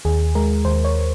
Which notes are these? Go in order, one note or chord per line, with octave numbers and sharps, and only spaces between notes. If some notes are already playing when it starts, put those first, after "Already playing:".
D#2 G#4
G#3 A#4
D#2 C5
C#5